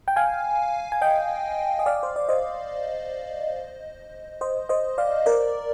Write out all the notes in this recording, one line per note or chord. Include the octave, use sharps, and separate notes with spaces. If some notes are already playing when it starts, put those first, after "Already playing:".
G5
F5 G#5
G#5
D#5 G5
D#5
D5 F5
C5
D5
C5 D#5
C5 D#5
C5 D#5
D5 F5
A#4 D5